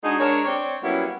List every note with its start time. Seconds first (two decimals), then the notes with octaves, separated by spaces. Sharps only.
0.03 G#3 D4 D#4 F#4 G#4
0.19 G#3 D4 A#4 C#5
0.45 C4 D4 C#5
0.82 F#3 G3 A#3 B3 C#4 E4